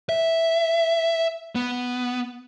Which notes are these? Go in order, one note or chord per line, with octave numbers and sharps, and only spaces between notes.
E5
B3